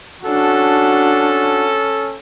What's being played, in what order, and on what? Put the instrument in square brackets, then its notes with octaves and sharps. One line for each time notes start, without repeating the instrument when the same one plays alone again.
[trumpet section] C#4 A4 [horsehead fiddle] D4 F#4